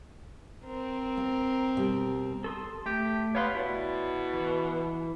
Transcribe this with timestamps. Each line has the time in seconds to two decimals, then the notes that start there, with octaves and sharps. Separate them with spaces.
0.66 C4 A#4
1.17 A#3
1.77 B2 G3
2.44 A4 C6 D#6
2.86 A3 G4
3.35 B3 C#5 F5 C6
3.55 B2 E4 D5
4.34 E3